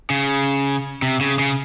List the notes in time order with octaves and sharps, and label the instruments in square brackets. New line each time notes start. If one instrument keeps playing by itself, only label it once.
[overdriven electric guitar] C#3
C3
C#3
C#3